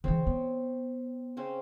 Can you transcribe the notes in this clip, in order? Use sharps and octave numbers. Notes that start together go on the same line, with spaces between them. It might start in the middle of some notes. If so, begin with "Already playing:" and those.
C#3 E3 C4 C#5
B3
C#3 C4 C#4